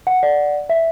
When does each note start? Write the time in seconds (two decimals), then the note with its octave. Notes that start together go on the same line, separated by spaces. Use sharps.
0.07 F#5
0.23 D5
0.69 E5